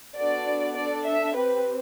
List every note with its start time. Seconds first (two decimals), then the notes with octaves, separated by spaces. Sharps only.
0.18 B3 D4 F#4 A4 D5
0.77 D4 A4 D5
1.07 E5
1.36 C4 G4 B4